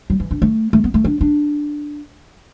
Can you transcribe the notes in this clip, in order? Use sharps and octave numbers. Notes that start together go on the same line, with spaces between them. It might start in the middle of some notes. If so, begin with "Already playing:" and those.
F#3
E3
D4
A3
A3
B3
A3
D4
D4